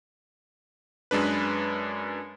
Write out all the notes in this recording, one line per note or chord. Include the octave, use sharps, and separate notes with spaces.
F#2 G#3 D4 B4